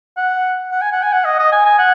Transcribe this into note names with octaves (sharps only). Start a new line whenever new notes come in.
F#5
F#5
G#5
F#5
G#5
F#5
D#5
D#5
G#5
G#5
F#5